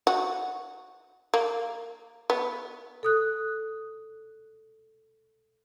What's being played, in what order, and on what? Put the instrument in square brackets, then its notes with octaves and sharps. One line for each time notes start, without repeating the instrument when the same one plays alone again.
[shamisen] F#4
A#3
B3
[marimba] A4 D#6 F#6